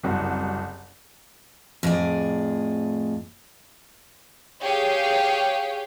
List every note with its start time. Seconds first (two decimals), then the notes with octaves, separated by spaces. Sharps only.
0.03 F#1 C2 F#4
1.83 F2 A2 G#4 D5
4.62 G4 G#4 C#5 F5 G5